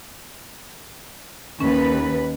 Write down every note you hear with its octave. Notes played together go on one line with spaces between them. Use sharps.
D#2 C#4 B4